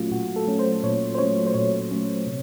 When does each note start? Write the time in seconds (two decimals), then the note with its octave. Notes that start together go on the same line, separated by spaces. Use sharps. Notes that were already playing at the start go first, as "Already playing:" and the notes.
Already playing: A#2 F#3 A3 C#4 F4 F#4
0.11 A#2 F#4
0.36 A4
0.47 F#3 A3 C#4
0.59 C5
0.83 A#2 C#5
1.15 C5
1.18 F#3 A3 C#4 C#5
1.47 C5
1.54 A#2 C#5
1.91 F#3 A3 C#4
2.27 C3